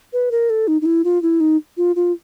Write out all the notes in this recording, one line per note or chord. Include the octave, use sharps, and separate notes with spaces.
B4
A#4
A4
D#4
D#4
E4
F4
E4
D#4
F4
F4